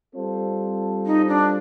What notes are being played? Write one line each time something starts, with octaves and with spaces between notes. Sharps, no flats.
G3 C4 F4 A4 C5
D#4
D4